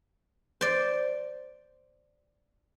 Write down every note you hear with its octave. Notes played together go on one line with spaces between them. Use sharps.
C5 D5